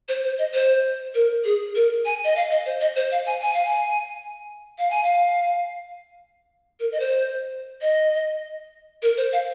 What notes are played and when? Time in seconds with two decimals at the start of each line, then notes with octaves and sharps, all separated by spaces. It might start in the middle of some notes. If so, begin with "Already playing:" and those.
0.09 C5
0.24 C5
0.39 D#5
0.54 C5
1.15 A#4
1.45 G#4
1.75 A#4
2.05 G#5
2.24 D#5
2.36 F5
2.51 D#5
2.66 C5
2.81 D#5
2.96 C5
3.12 F5
3.27 G#5
3.42 G#5
3.54 F5
3.65 G#5
4.78 F5
4.91 G#5
5.04 F5
6.80 A#4
6.92 D#5
7.00 C5
7.81 D#5
9.02 A#4
9.17 C5
9.33 F5